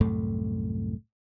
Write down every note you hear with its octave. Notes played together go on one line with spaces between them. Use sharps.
C2 F#2 A2 A3